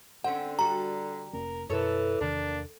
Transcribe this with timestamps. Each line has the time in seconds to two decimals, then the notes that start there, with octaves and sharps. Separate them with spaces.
0.24 D3 C4 C#4 F#5
0.59 G3 F#4 A#5
1.33 F1 A#3 C#4 A#4
1.70 F#2 B2 E3 A4 A#4 C#5
2.21 E2 C3 D#3 A#3 D4